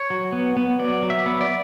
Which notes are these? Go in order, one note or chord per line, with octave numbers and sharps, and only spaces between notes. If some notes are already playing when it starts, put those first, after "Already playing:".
Already playing: C#5
F#3
B3
B3
F#3 D5
F#3
E5
B3
D5